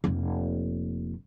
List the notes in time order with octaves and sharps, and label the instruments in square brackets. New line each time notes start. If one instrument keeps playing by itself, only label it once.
[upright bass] F1 A#3